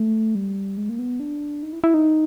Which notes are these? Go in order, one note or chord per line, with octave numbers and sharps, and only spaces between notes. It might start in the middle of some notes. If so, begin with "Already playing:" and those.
Already playing: A3
G3
G#3
A#3
B3
D4
D#4
E4
E4
D#4